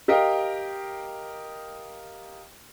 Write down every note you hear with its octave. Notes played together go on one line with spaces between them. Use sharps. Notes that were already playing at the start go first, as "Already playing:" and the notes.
G4 A#4 D#5 F5 G5